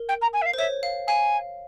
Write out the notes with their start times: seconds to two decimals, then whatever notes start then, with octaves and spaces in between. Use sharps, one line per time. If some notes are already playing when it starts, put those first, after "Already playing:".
Already playing: A#4
0.09 G5
0.22 A#5
0.33 G#5
0.42 E5
0.46 F5
0.54 C5
0.58 C#5 E5
0.83 F5
1.07 F5 G#5